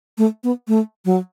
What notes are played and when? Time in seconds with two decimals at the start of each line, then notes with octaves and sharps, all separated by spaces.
0.18 A3
0.44 B3
0.68 A3
1.05 F#3